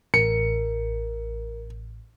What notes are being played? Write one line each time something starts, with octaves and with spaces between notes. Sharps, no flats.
A1 A#4 C#7